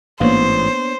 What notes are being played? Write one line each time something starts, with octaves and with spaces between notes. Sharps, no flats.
A1 G#2 A#3 B3 D4 C5 C#5